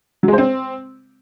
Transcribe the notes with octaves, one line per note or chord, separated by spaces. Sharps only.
F#3
G#3
C5
C4